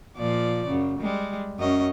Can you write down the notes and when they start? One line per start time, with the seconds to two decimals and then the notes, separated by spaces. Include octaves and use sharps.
0.17 A#2 F3 D5
0.67 F#2 C#3
0.99 G3 G#3
1.59 F#2 C#4 D#5